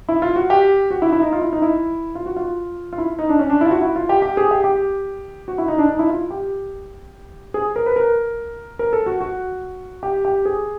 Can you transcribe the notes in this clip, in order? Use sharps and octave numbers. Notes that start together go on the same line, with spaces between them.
E4
F4
F#4
G4
F#4
E4
E4
D#4
F4
E4
D#4
E4
F4
F#4
F4
F4
E4
D#4
D4
C#4
D4
E4
F4
F#4
E4
F4
G4
G4
G#4
G4
G4
F#4
E4
D#4
D4
D#4
E4
F4
G4
G#4
A#4
B4
A#4
A#4
A4
F#4
F#4
G4
G4
G#4